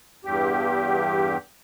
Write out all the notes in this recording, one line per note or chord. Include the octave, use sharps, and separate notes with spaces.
E2 G2 G4